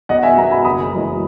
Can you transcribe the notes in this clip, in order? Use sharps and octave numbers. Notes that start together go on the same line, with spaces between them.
B1 D#5 F#5
E5 G#5
B2 F#3 F#5 A#5
G#5 B5
F#1 B5 D#6
F#2 E3 G#3